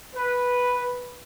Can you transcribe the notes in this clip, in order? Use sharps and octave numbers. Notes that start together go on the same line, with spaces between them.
B4